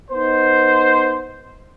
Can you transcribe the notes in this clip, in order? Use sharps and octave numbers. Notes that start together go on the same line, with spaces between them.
B3 D#4 C5